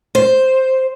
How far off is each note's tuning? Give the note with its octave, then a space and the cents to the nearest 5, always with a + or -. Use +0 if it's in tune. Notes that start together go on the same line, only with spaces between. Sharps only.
C5 +0